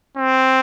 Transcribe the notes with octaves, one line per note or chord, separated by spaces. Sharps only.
C4